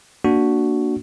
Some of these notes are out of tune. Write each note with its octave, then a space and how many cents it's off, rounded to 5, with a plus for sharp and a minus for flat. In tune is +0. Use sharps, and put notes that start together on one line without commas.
A#3 +0 D4 -5 F#4 +0